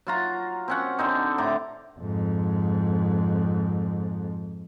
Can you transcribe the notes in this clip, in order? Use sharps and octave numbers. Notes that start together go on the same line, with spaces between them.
F#3 F4 A#5
C4 C#4 F#5
D3 C4 D#4
A2 A#5 D6
F2 G#2